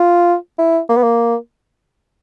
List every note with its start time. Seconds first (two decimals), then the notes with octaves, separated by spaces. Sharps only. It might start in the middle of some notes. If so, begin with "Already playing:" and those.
Already playing: F4
0.58 E4
0.89 A#3
0.97 B3
1.03 A#3